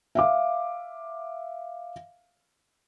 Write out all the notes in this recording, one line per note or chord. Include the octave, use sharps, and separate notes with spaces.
E5 F5 D6